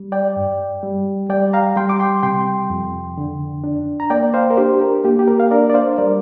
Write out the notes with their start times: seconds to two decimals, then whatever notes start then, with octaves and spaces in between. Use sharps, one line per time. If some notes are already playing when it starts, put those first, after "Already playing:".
Already playing: G3
0.12 D5 G5
0.37 G2
0.83 G3
1.30 G3 D5 G5
1.53 F5 A#5
1.77 G3 G5 C6
1.89 D6
2.00 G5 C6
2.23 C3 G5 C6
2.70 F2
3.18 D3
3.64 D4
4.00 A#5
4.10 A#3 D5 G5
4.34 C5 F5
4.50 A#4
4.57 D4 G4 C5
4.81 A#4
5.05 A#3 G4
5.19 G4
5.28 A#4
5.40 F5
5.51 D4 A#4 D5
5.70 D5
5.74 C5 F5
5.98 G3 A#4 D5